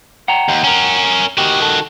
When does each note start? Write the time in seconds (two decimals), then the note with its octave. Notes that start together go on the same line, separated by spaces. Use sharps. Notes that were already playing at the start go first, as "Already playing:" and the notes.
0.28 F#5 G5 A#5
0.49 D#2
0.64 C#4 A#4
1.38 D#3 F#4 G4
1.62 A4